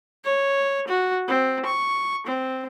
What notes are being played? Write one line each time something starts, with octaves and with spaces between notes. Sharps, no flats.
C#5
F#4
C4
C#6
C4